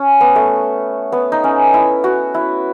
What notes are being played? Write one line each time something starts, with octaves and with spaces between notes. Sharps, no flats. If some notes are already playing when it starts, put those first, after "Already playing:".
Already playing: C#4
B3
A3
B3
D#4
C#4
E4
F#4
E4